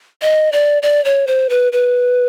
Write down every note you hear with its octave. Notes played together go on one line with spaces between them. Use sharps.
D#5
D5
D5
C#5
C5
B4
B4